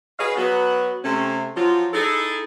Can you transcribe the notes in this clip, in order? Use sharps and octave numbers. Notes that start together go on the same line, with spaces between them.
F#4 G#4 B4 C#5 D#5 F5
F#3 B3 F#4
C3 A3 C#4
F3 F#3 F4
D#4 E4 G#4 A4